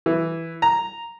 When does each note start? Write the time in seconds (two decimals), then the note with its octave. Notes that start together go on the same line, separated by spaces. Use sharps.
0.06 E3
0.62 A#5